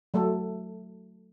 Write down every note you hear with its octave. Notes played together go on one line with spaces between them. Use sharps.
F#3 A3 A4